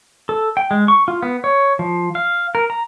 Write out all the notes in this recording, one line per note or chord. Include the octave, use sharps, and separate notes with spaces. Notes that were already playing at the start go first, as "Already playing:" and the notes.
A4
G5
G#3
C#6
F4
B3
C#5
F3
F5
A#4
A#5